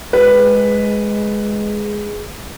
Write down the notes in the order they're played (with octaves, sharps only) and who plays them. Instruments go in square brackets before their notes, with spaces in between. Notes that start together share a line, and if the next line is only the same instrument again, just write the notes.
[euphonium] G#3 [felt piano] B4